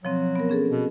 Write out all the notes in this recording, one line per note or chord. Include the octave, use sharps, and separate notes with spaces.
B2 F3 F#3 C4
B3 A#4
C#4 G#4 A4
B2